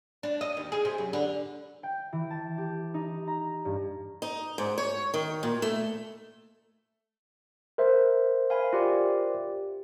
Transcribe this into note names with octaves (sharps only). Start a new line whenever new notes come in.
D4
D#5
D#2
G#4
C3
F#2
D3
G5
E3
A5
G4
D#4
A#5
G2
D#4
G#2
C#5
D#3
A#2
A3
A#4 C5 E5
F5 G#5 B5
F4 G4 D5